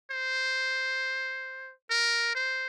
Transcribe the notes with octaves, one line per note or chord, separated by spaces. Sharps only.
C5
A#4
C5